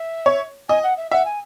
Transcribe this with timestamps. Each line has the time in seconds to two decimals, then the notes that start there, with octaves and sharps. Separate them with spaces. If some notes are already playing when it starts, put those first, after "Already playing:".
Already playing: E5
0.26 C#5
0.69 D#5 G#5
0.84 F#5
0.97 E5
1.11 E5 F#5
1.25 G#5